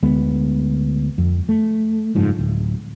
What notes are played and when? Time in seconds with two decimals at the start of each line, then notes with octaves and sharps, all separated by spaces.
0.03 D2 G#3 B3
1.18 F2
1.49 A3
2.15 F#1 G#2 F3
2.39 D1